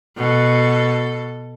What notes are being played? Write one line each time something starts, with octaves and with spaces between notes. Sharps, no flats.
B2 A4